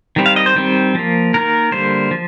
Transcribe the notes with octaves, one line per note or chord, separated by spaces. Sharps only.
D#3 G3 C4
F5
D#5
C5
D#3 G3 C4
F3 A#3
D#3 A#3 A#4
D3 G3 A#3 C5
F3